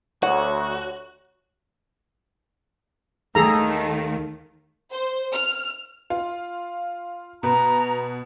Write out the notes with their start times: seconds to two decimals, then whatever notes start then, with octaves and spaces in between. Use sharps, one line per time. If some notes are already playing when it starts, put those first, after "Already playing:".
0.23 D2 F#4 C#5 F#5
3.35 D#2 D#3 A3 G#4 A4 A#5
4.92 C5
5.33 F6
6.10 F4
7.43 B2 B4 A#5